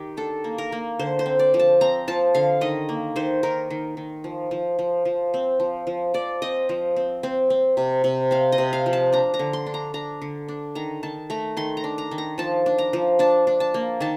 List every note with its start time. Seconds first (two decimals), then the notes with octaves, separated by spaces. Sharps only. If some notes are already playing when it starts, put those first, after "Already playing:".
Already playing: D#3 G4
0.17 D4 A4
0.44 A#3
0.58 A#4
0.72 A#3
0.99 D3 C5
1.19 C5
1.26 C4
1.39 D5
1.54 F3
1.59 A5
1.81 C4 A#5
2.08 F3 A5
2.35 D3 F5
2.61 D#3 D#5
2.89 A#3
3.16 D#3 C5
3.43 D#3 A#4
3.70 D#3
3.97 D#3
4.24 F3
4.51 F3
4.79 F3
5.05 F3
5.34 C4
5.60 F3
5.87 F3
6.14 F3 D5
6.42 C4 D#5
6.69 F3
6.96 C4
7.23 C4
7.50 C4
7.77 C3
8.04 C3
8.31 C4 F5
8.52 D#5
8.58 C3
8.73 F5
8.86 F3
8.93 A5
9.13 D4 A#5
9.34 A#5
9.39 D3
9.53 C6
9.66 D4
9.74 A#5
9.94 D4 A#5
10.22 D3
10.48 D4
10.75 D#3 A#5
11.03 D#3 A5
11.30 A3 A#5
11.57 D#3 C6
11.77 A#5
11.84 D4
11.98 A#5
12.11 D#3
12.18 A#5
12.38 F3 A5
12.66 D4
12.78 A#5
12.93 F3
13.19 D4 A5
13.47 D4
13.60 A5
13.74 A#3
14.01 D#3 A5